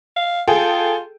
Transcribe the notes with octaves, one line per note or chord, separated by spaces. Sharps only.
F5
F4 G#4 A4 G5